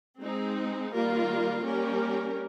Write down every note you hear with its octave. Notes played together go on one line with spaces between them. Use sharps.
G#3 C4 D#4
D#3 G3 A#3 F4 A#4
G3 A#3 C#4 G4 A#4